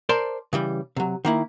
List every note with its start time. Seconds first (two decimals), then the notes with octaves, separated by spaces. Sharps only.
0.09 A#4 C5 D5 A5 C6
0.53 C#3 E3 G3
0.96 C3 F#3
1.25 D#3 A#3 E4